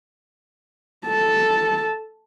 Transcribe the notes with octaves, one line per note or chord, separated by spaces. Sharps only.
A4 A5